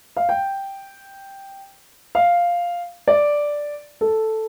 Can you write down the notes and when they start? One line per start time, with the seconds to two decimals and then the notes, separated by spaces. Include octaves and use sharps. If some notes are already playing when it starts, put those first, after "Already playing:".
0.17 F5
0.29 G5
2.15 F5
3.07 D5
4.01 A4